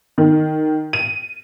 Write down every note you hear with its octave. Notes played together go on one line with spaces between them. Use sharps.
D#3
D#7